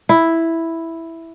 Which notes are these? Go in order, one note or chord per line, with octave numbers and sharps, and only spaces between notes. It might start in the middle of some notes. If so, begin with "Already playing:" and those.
E4